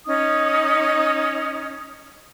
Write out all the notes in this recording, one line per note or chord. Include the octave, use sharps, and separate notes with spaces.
C#4 D#4 D#6